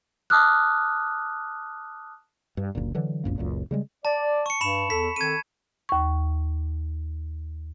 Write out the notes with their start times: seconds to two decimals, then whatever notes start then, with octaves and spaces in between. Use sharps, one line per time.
0.30 A5 D6 D#6 F6 F#6
2.57 G2
2.75 F#1 D2 A#2
2.95 D3 E3 F#3
3.24 E1 A#1 F#2 A#3
3.38 F#1 C#2 F#2 A#2
3.71 C#3 G3 G#3
4.05 D5 A5
4.46 C#6 C#7
4.61 G2 B5 E7
4.90 E2 A4 B6
5.16 D#3 C4 A4 G#6 D#7
5.89 D#2 C#6